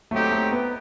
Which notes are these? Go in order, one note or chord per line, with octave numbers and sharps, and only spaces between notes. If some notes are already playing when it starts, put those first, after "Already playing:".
F#3 A3 C4 D#4 G4
A3
B3